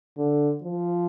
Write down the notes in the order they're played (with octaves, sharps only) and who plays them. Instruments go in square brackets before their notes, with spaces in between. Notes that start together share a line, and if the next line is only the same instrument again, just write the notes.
[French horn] D3
F3